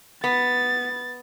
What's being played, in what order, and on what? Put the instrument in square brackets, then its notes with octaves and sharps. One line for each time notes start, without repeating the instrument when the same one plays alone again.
[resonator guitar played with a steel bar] B3 [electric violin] A6